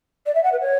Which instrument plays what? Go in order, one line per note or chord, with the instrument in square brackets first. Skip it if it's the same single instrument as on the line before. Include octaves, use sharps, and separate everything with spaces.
[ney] D5
E5
F#5
B4
C#5